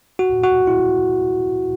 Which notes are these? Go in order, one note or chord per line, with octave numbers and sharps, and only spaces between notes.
F#4
F#4
E4